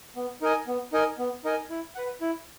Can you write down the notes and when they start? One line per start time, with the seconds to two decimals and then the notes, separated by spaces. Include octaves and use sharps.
0.16 B3
0.42 D#4 A#4 D#5 G#5
0.67 B3
0.92 D#4 A#4 D#5 G#5
1.18 B3
1.44 D#4 A#4 D#5 G#5
1.70 E4
1.95 B4 F#5
2.21 E4